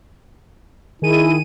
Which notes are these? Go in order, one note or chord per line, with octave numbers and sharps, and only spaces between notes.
D#3 E4 G#4 D#7